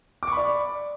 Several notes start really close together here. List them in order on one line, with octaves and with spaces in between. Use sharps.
D6 C#6 B5 D5